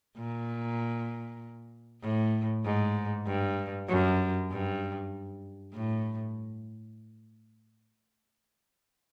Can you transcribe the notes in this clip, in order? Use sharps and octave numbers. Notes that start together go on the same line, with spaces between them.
A#2
A2
G#2
G2
F#2
G2
A2